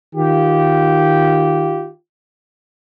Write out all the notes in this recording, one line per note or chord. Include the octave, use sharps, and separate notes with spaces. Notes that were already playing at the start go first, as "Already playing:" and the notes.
D#3 F4 G4